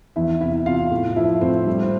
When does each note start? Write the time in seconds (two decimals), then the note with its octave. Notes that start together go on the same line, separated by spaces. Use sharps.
0.16 E2 E4 E5
0.40 C3 E4 E5
0.66 C3 F4 F5
0.91 A2
1.16 F3 E4 E5
1.41 A2 C4 C5
1.67 G3
1.82 C5